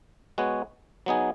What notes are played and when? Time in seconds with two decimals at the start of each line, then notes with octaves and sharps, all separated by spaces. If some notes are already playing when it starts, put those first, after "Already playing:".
0.38 G#3 B3 F#4 C#5
1.06 F#3 B3 D#4 G#4